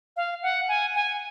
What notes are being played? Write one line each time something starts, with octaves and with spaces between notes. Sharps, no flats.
F5
F#5
G#5
G#5